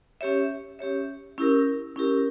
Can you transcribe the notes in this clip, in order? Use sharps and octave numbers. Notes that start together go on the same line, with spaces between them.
C#4 G4 C#5 E5
C#4 G4 C#5 E5
C#4 E4 G4 A#4
C#4 E4 G4 A#4